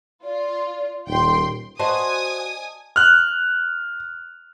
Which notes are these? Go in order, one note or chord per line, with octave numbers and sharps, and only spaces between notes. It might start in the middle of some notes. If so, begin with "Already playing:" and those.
F4 D5
D#1 D#4 G5 C6
F#4 B4 C5 D5 D#5 G#5 A5 D#6
F6 F#6